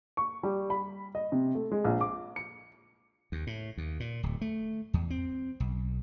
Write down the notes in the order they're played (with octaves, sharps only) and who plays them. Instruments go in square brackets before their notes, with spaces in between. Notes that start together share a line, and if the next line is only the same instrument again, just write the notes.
[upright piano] C#6
G3
B5
D#5
C3
A3
G#3
A#1
D6
C#7
[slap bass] D#2
A2
D#2
A#2
D1
A3
E2
C4
B1